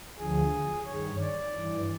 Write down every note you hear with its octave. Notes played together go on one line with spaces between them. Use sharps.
D2 D3 F3 G#4
G2 D#3 C#5
D5
G2 E3